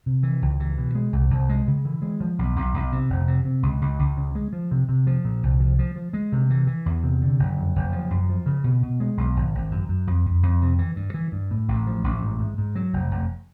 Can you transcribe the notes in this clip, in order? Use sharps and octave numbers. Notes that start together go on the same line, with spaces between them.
C3
E3
C#2
E3
B2
G#3
C2
C2
G#3
C#3
E3
G#3
F3
B1
B1
B1
C3
F1
C3
C3
C#2
C#2
C#2
C#3
G#3
F3
C3
C3
F3
A#2
C2
F3
F3
F3
G#3
C3
E3
E3
E2
C3
D3
F#1
F2
F#1
F3
F#2
F3
C#3
B2
B2
G#3
B1
G#1
G#1
F#2
F#2
F2
F2
F2
C3
E3
G2
E3
G2
A2
A1
F3
A1
G#2
G#2
G#2
F#3
F1
F1